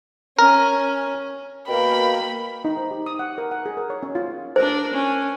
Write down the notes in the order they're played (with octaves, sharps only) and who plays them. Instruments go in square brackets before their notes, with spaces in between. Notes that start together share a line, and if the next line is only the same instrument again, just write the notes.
[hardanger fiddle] C#4 [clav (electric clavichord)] A#4
[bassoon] B2 [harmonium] A#3 A#4 G5 [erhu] B5
[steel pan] D#4
C5
G4
D#6
F#5
A#4
F#5
G#4
A#4
C#5
C#4
F4
[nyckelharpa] D4 A#4 [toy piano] C5
[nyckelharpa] C#4